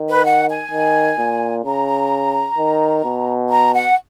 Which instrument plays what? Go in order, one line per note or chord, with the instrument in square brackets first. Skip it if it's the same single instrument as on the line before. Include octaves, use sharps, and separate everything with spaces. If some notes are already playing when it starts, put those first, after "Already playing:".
Already playing: [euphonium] D#3
[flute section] B4
F#5
G#5
[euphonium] D#3
A#2
[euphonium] C#3 [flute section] A#5
[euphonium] D#3
B2
[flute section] A#5
F#5